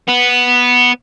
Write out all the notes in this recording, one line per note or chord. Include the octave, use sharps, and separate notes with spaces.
B3